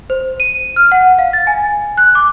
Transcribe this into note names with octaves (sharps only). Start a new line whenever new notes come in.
C5
D#7
F6
F#5
F5
A6
G#5
F#6
D6